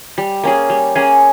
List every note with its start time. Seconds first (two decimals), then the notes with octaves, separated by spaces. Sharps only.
0.18 G3
0.43 A#3 C#4 G#4
0.70 G3
0.95 A#3 C#4 G#4